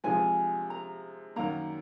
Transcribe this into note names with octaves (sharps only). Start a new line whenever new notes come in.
C3 F3 G#3 G#5
A#5
F#2 D#3 A#3 A#5